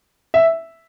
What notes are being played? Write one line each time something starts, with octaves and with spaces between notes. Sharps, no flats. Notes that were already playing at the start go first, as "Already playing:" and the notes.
E5